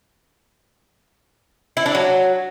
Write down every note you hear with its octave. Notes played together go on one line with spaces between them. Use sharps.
E4
D4
F#3